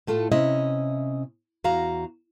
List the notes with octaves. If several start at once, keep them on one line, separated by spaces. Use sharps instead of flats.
A2 A3 F4 A4
C3 C#4 E4 D#5
E2 F#4 F5 A#5